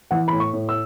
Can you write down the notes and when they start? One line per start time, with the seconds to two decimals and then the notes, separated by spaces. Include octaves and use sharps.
0.11 E3 F#5
0.28 A2 B5
0.40 C#6
0.53 A2
0.69 E6